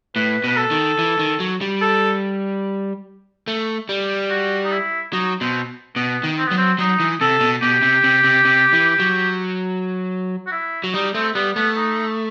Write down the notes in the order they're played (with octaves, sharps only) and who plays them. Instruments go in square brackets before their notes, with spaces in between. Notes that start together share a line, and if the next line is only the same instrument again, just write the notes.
[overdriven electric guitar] A2 [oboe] B4
[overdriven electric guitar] B2 [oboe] B4
[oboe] A4
[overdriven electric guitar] D#3
E3
D#3
F#3
G3
[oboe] A4
[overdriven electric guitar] A3
G3
[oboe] F#4
D#4
E4
[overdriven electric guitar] F#3 [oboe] D#4
[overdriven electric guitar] B2 [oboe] C4
[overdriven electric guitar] B2 [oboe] B3
[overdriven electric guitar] D#3
[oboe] C4
[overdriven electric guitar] F#3 [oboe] B3
[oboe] C4
[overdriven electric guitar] F#3 [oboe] D#4
[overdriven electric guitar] E3
[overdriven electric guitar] C3 [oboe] A4
[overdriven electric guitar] B2
[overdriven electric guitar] B2 [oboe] G4
[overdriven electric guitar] C3
C3
C3
C3
E3
F#3
[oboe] F#4
E4
[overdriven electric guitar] F#3
[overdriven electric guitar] G3 [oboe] D#4
[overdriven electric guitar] A3 [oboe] C4
[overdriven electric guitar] G3 [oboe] B3
[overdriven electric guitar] A3 [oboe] B3
[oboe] D#4